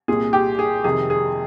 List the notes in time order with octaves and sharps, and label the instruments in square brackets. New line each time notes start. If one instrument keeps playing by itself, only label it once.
[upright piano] C2 A#2 G#4
G4
G#4
F2 C3 D#3 G#4
G#4